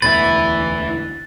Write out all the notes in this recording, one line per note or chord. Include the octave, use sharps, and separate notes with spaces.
E1 D2 B2 E4 B4 A6